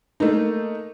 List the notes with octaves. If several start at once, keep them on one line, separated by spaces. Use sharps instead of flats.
A3 A#3 D#4